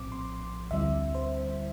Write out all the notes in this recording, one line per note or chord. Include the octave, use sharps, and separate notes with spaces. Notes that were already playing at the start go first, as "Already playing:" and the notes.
Already playing: A#1 A2 F3 C4 D6
C6
D2 D3 G3 C4 E4 E5
C5